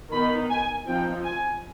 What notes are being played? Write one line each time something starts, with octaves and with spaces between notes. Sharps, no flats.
D#3 B3 D#4 B5
G#5
F3 C4 D#4 G5
G#5